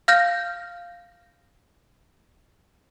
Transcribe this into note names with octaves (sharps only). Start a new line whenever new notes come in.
F5 F6 G6 A#6